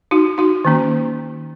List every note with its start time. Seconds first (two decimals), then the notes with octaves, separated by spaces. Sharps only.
0.11 D#4 F#4
0.38 D#4 F#4
0.65 D#3 A#3 C#4